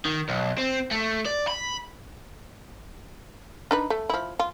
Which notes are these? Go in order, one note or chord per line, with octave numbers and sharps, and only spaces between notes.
D#3
B1
C4
A3
D5
B5
D4 D#4 B4
A3
F3 E4
F4